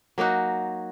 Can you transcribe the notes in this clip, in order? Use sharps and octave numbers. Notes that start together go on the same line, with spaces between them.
F#3 A#3 D#4 F#4